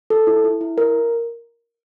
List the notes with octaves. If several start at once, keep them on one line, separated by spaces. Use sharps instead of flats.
A4
E4
E4
E4
A#4